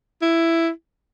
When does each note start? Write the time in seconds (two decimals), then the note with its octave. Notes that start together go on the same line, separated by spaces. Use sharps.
0.22 E4